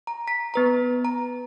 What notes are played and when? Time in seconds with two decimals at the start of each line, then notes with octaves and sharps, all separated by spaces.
0.07 A#5
0.27 A#5 B6
0.54 B3 B4 A#5
1.05 A#5